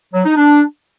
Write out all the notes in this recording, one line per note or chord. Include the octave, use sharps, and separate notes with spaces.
F#3
D#4
D4